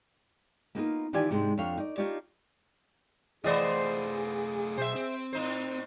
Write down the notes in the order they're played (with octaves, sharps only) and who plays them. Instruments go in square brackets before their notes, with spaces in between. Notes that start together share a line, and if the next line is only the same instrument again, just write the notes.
[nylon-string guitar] A#3 B3 D#4 F4 G#4 A#4
D#3 E3 F4 G4 D5 G#5
G#2 C3 G#3 D4 C5
F2 D4 A4 C#5 F5
D#4 D5
D4 D#4 F4 G4 C#5 D5
[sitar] E3 B3 C5 [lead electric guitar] A3 F4 [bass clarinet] G#4 [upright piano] D5 D#5
[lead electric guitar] B2 F#3 [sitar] C5 E5
[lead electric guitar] C4
[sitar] A2 D#4 C5